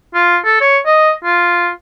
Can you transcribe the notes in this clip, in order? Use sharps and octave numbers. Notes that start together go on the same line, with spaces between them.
F4
A4
C#5
D#5
F4